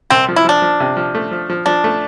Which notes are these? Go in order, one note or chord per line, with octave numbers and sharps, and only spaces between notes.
C2 C4
F3
E4
F3 D4
F3
C3
F3
A3
F3
F3
F3 D4
A3